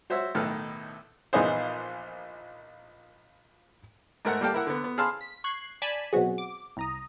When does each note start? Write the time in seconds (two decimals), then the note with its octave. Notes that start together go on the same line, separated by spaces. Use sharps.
0.10 F#4 C5 C#5 E5 E6
0.35 B1 A2 D#3 A4 B4 F6
1.33 A#1 E3 B3 D#4 G#4 C5
4.25 G#2 A3 A#4 F#5
4.41 G3 A#3 A4 F5 G5
4.54 E4 A#4 F#5
4.67 D3 B3
4.84 B3
4.98 G#4 F5 A5 B5 C6 F6
5.21 B6
5.44 C#6 F#6 G#6 C7
5.82 D5 G#5 A5 B5
6.13 B2 F#3 C4 F#4 G#4
6.38 D6
6.77 C2 A#5 D#6